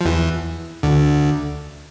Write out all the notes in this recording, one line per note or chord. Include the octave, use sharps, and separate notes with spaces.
F3
E2 E3
D2 D3